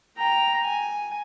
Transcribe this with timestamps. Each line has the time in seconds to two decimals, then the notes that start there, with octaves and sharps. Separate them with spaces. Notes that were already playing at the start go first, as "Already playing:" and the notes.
0.17 G5 A#5
0.64 G#5